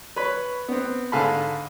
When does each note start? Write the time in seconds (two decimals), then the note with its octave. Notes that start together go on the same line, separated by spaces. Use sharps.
0.16 B4 C#5 B5
0.68 B3 C4
1.12 G#2 D3 F5 G#5 A5 B5